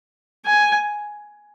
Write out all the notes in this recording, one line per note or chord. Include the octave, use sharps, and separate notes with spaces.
G#5